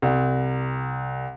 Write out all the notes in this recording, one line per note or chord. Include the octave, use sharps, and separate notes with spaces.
C2